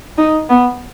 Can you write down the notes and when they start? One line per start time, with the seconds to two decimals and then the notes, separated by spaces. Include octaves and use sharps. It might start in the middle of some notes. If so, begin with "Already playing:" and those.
0.18 D#4
0.49 B3